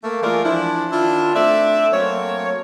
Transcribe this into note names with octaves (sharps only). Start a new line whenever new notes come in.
A3 A#3
E3 G#3 A3 F4 A#4 D5
E3 F3 D4 E4
D#3 D4 E4 F4
A3 C4 D4 D5 E5
F#3 A3 A#3 C4 C#5